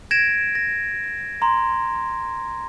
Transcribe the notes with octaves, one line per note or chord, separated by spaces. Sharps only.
G#6 A#6 D7 E7
A#6
A#5 C6